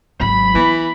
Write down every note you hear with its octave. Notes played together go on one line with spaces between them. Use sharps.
G#1 F#3 B5
E3 B3